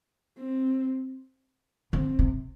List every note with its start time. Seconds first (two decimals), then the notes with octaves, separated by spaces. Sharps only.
0.39 C4
1.93 D3 C4
2.19 C3